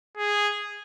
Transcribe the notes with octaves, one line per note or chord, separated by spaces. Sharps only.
G#4